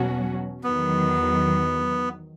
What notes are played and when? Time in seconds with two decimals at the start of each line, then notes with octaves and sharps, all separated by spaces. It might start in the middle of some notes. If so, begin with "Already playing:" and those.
Already playing: E2 B2 F#3 C#4 F#4
0.64 E2 D#3 F#3 B3